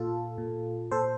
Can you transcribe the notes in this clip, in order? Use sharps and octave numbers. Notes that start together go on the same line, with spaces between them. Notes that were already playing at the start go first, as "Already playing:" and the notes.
Already playing: A#2 F4 A4
A#2
A#2 A4 C5